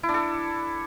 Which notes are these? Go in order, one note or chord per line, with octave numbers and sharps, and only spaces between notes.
E4
D4
A4